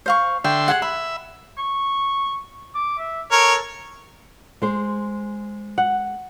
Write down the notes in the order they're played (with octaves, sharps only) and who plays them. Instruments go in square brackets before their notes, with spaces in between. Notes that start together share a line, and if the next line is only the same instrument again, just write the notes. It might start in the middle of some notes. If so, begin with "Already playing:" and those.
[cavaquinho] C5 F5 C#6
[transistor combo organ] D3 E5 C6 [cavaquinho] G5
[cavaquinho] G#4 F#5
[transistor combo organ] E5 [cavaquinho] B5
[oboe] C#6
D6
E5
[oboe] A4 [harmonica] A#4 C#5
[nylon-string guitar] G#3 C5
[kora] F#5